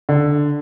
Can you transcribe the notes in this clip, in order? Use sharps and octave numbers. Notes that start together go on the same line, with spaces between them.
D3